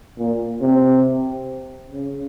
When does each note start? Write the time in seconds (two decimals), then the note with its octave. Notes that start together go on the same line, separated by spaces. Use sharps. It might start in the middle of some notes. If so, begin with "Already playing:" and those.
0.18 A#2
0.62 C3
1.92 C#3